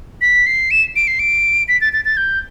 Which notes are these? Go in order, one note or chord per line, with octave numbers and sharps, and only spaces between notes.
B6
C7
E7
D7
C7
D7
B6
A6
A6
A6
G6